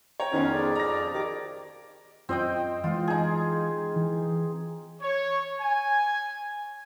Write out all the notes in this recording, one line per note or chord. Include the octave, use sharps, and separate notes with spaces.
C#5 G5 A#5
F2 D#3 B3 C#4 F4
G#4 D5
A#5 A#6
D#3 F#4 G4 D6
F#2 C4 F4 D#5 G5
E3 G#3 F4
D#4 G#4
E3
C#5
G#5